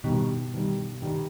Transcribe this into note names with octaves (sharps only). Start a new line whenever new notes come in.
G2 B2 D#3 G3
G2 D#3 G3
G2 D#3 G3